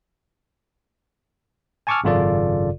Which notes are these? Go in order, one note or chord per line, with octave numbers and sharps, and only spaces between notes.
G#5 A5 C#6 D6 E6 F6
G#1 F#2 C#3 F4 A4 D5